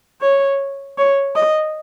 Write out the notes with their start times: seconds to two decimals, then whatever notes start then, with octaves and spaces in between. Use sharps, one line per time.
0.21 C#5
0.98 C#5
1.36 D#5